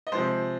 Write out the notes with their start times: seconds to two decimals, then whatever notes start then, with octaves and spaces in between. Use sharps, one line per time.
0.07 D#5
0.12 C3 F3 G#3 C5